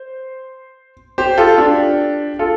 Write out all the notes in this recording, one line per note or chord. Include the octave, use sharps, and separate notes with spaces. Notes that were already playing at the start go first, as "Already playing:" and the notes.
Already playing: C5
G4 C5
F4 A4
D4 G4
F4 A4